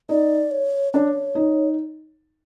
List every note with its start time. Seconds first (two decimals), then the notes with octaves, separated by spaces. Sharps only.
0.09 D#4 D5
0.51 C#5
0.93 D4 C#5
1.35 D#4